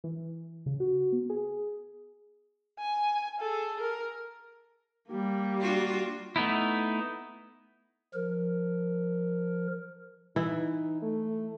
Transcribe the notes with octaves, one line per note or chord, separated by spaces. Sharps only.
E3
C#3
F#4
B3
G#4
G#5
G#4 A4
A#4
G3 A#3
D4 F4 F#4
A3 B3 D#4 E4
F3 A#4
E3 D#4 E4
A3